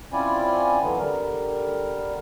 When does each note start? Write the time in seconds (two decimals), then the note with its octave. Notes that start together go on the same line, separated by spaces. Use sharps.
0.13 C4 C#4 E4 F4 D5 G#5
0.82 D3 E3 F#3 B3 C4
0.99 D3 G3 A#4